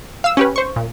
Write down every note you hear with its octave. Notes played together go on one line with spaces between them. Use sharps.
F5 E6
C#4 G4 B4
C5 C#6
A#2